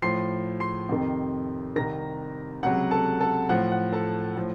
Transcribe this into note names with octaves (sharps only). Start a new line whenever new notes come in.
A2 F3 C6 C7
C6 C7
F2 C3 D#3
C2 C3 D#3 A#5 A#6
C#2 C3 F#3 F#5 F#6
A4 A5
A4 A5
A2 F3 F#5
F#5
A4 A5
A2 F3